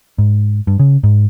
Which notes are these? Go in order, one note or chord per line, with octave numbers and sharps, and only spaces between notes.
G#2
G2
C#3
G#2